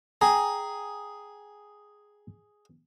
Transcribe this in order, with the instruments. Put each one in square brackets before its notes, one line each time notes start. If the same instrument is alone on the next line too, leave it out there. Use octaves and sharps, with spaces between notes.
[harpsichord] G#4 [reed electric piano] G5 G#5 A#5